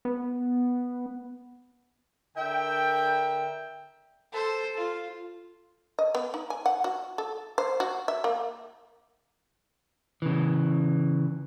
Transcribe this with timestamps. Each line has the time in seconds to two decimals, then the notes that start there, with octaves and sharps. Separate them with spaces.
0.05 B3
2.37 D3 A#4 E5 G5
4.33 A4 C5
4.77 F4
5.99 D#5
6.15 B3
6.34 D#4
6.50 G#5
6.66 F#5
6.84 F#4
7.18 A4
7.58 C5
7.80 F#4
8.08 E5
8.24 A#3
10.22 C#3 E3